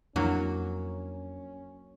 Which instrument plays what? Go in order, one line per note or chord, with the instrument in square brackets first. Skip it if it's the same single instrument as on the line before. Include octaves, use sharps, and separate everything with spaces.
[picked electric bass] F2 [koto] F#3 A#3 F#4 [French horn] C#4 [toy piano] D4 E4